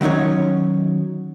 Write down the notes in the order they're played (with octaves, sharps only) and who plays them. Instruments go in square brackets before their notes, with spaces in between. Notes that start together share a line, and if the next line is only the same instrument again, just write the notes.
[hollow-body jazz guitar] D#3 F#3 C#4 D#4 C#5